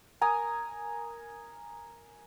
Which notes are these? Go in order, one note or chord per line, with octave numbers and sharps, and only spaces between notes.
A#4 G#5 A#5 D#6